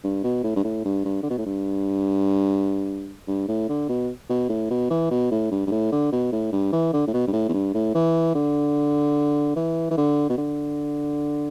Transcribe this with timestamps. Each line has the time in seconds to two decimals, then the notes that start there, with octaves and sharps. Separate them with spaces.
0.04 G2
0.24 B2
0.44 A2
0.56 G2
0.64 A2
0.84 G2
1.05 G2
1.23 D3
1.30 B2
1.38 A2
1.46 G2
3.27 G2
3.48 A2
3.69 D3
3.89 B2
4.29 B2
4.49 A2
4.70 B2
4.90 E3
5.11 B2
5.31 A2
5.51 G2
5.67 G2
5.71 A2
5.92 D3
6.12 B2
6.32 A2
6.52 G2
6.72 E3
6.93 D3
7.07 A2
7.13 B2
7.27 G2
7.33 A2
7.48 E2
7.53 G2
7.74 A2
7.94 E3
8.35 D3
9.56 E3
9.91 E3
9.97 D3
10.29 B2
10.38 D3